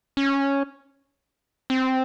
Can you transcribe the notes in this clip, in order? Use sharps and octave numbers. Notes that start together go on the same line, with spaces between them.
C#4
C4